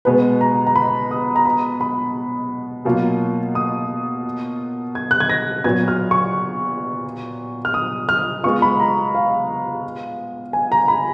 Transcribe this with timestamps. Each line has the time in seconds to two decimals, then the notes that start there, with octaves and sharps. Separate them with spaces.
0.05 B2 G#3 B3 B4
0.41 A#5
0.67 A#5
0.76 B5
1.11 D#6
1.36 A#5
1.46 B5
1.81 B5
2.85 B2 F#3 A#3 F4
3.55 D#6
4.95 G#6
5.11 F#6
5.20 G#6
5.30 A#6
5.64 A#2 F#3 B3 G#6
5.88 F6
6.11 C#6
7.65 F6
7.74 D#6
8.09 F6
8.44 G#3 B3 F4 C#6
8.62 B5
8.80 A#5
9.15 F5
10.53 G#5
10.72 A#5
10.88 B5